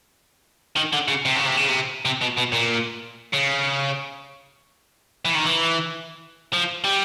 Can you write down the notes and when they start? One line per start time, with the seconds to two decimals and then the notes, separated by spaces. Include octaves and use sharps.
0.77 D#3
0.93 D3
1.08 C#3
1.25 C3
1.36 C#3
1.46 C3
1.57 C#3
1.68 C3
2.05 C3
2.21 B2
2.37 B2
2.52 A#2
3.33 C#3
5.25 E3
5.35 D#3
5.45 E3
6.53 F3
6.84 G3